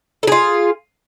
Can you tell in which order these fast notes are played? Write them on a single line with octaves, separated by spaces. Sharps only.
A4 G#4 F4